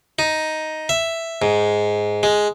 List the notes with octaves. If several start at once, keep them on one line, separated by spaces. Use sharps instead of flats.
D#4
E5
G#2
G#3